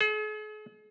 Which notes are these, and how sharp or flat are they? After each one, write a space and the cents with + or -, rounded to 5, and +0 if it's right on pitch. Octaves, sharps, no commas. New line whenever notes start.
G#4 +45